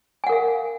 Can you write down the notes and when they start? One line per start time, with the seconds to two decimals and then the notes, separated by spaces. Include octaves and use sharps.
0.24 G#5
0.27 F#5
0.29 A#4
0.32 F5